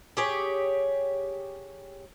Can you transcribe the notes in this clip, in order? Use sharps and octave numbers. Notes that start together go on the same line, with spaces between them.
G4 G#4 C#5